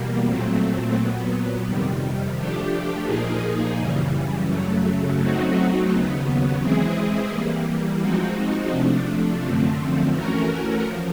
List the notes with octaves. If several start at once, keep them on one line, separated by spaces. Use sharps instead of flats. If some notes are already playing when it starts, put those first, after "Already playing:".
Already playing: E2 B2 G3 A#3
A#2 F#3 A3 C4
A#2 F#3 B3
F2 C3 D#3 G3
F3 A3 D4 G4
A#2 F3 A#3 D#4 G#4
F#2 C#3 E3 G3
F#2 C#3 F#3 A3
F#3 A3 C4 D#4 F#4
D#2 C#3 F#3 B3
E3 G#3 C4 E4 G#4
E3 G3 A#3
F3 G#3 C4 D#4 F#4
C3 F3 A3 D4
F#2 D3 F3 A3 C4
E3 A3 C#4 F#4 A#4
F3